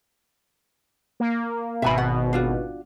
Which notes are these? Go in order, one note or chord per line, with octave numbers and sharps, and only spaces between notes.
A#3
G#1 B2 E5 G#5 B5
F#5
D4 F4 F#4